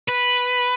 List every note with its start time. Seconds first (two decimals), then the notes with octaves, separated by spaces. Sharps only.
0.09 B4